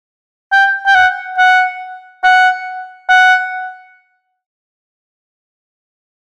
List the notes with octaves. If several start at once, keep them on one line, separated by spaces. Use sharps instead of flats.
G5
G5
F#5
F#5
F#5
F#5